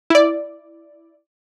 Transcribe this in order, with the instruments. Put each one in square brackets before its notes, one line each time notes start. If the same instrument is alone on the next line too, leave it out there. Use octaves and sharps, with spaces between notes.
[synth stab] E4 D5